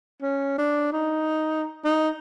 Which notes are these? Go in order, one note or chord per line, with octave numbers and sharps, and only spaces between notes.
C#4
D4
D#4
D#4